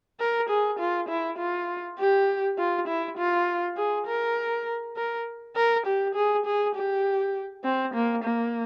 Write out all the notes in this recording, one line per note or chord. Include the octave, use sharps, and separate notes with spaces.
A#4
G#4
F4
E4
F4
G4
F4
E4
F4
G#4
A#4
A#4
A#4
G4
G#4
G#4
G4
C4
A#3
A#3